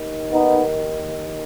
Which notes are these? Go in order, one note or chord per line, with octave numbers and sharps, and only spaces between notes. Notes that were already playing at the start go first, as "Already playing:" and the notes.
Already playing: D#2 D#3
B3 D#4